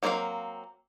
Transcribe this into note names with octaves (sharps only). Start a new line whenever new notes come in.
F#3 A#3 C4 F#4 F5